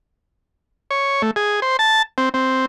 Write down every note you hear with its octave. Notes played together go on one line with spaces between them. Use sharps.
C#5
A3
G#4
C5
A5
C4
C4